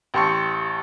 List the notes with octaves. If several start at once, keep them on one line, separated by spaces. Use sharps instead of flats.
A1 G4 A5 C6 C#6 C#7